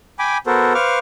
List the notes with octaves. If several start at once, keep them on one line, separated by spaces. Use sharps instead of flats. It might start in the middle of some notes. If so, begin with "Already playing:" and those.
G5 G#5 B5 D6
B3 F#4 A4 A#4 C5
B4 C5 F5 C#6 D6 F6